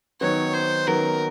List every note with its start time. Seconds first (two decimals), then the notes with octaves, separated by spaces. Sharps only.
0.21 D#3 F#3 B3 C#5
0.54 C5
0.87 D#3 F#3 B3 A#4